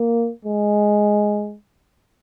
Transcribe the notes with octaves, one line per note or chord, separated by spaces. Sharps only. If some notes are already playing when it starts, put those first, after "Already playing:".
Already playing: A#3
G#3